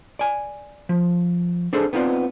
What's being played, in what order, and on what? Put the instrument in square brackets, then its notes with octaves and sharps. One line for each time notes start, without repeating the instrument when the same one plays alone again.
[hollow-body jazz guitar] D5 G#5
F3
D4 G#4 A4 C5
B3 C4 D#4 F4 C#5 D5